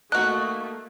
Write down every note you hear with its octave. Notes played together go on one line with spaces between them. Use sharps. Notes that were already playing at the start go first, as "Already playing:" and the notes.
A3 A#3 D#4 F#4 F#6